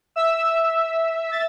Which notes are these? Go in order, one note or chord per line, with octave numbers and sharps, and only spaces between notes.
E5 E6
A6